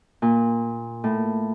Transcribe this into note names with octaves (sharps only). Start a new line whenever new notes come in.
A#2
A2